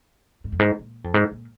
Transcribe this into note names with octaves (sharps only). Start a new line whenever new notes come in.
G#2
F2
G#2
A#2
F2
G#2
A#2